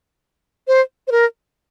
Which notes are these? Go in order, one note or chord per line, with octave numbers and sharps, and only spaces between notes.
C5
C5
A#4